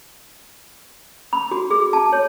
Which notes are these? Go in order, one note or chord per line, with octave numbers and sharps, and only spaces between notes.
B5
F#4
G#4
A5
C#5